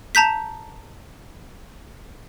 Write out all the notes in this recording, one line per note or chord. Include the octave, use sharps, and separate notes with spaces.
A5 A#5 G6 B6